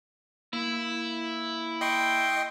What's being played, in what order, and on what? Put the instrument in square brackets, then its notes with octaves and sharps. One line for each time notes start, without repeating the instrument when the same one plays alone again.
[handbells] A#3 [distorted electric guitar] E4
[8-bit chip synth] D#5 C6 C#6 [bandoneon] G5